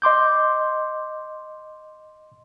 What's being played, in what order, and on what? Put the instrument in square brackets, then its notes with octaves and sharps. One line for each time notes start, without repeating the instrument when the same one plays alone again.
[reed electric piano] D#5 C6 D6 G6